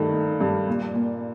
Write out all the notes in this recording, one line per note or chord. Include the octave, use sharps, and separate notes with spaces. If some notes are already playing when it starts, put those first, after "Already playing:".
Already playing: G2 D#3 A3
D#4
G2
A#2
A#2